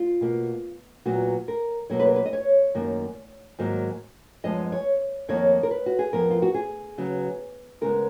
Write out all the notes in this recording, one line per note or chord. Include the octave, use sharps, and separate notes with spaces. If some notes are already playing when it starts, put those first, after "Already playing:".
Already playing: F4
B2 A#3
A#2 F#3 B3 F#4
A#4
B2 F#3 A#3 C#5
B4
A#4
B4
D#5
C#5
F#2 D#3 A#3
G#2 D#3 F#3 A#3
F#2 F3 G#3 B3 D#5
C#5
F2 D#3 A#3 C#5
A#4
B4
F#4
G#4
F2 F3 B3 A#4
F4
F#4
G#4
C#3 F#3 B3
C#3 G#3 B3 A#4